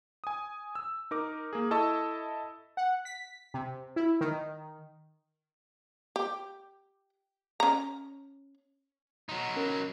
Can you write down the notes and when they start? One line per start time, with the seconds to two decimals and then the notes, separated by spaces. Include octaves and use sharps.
0.24 G#5 D#6
0.75 E6
1.11 D#4 A#4 D6
1.53 A#3 G#4
1.71 E4 A4 D#5 A5 C#6 E6
2.77 F#5
3.05 B6
3.54 C3
3.96 E4
4.21 D#3
6.16 G4
7.60 C#4 A#5
9.29 F#3 D#4
9.56 C#4 A#4